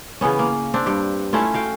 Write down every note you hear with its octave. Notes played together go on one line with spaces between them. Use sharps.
C#3 E3 B3 C#4
A#3
C4 D4
G2 G4
A3 C#4 E4 F4
F#4 F5 G5